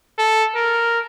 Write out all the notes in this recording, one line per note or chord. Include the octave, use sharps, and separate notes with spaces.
A4
A#4